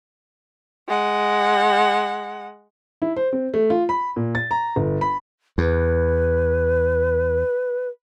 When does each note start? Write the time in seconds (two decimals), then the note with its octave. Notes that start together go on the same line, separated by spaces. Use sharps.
0.88 G#3 F#5
3.02 E4
3.16 C5
3.33 C4
3.54 A3
3.70 F4
3.89 B5
4.16 A#2
4.35 A6
4.51 A#5
4.76 G1
5.01 B5
5.58 E2 B4